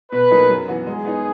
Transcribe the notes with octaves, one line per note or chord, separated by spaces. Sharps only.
B2 B4
F#3 A#3 D#4 G#4
F#2
E3 B3 F#4
G#3 G#4
B3 D#4